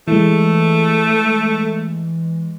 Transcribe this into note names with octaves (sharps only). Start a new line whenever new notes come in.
E3 G#3 A3